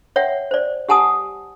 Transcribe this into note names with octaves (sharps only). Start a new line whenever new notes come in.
C#5 E5 F#5 G5
C5 D5
G4 F#5 G#5 A5 D#6